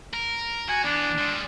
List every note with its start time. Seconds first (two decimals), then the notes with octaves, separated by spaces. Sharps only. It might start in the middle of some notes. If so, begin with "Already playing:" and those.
0.14 A#4
0.69 F#4 G#5
0.84 E3 B3 D4
1.18 G3 G#3